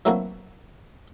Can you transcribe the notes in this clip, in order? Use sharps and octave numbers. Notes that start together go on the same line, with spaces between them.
E3 F#3 A3 A#3 C4 F#4